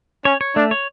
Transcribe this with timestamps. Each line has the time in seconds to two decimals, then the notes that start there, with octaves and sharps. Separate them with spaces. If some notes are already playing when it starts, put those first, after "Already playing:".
0.25 C#4 C#5
0.41 C#5
0.56 A3 D4
0.71 C#5